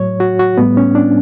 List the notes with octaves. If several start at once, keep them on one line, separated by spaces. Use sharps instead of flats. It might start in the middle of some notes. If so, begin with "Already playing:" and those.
Already playing: A2 F#3 C#5
F#4
F#4
A2 G3 B3
C#4
D4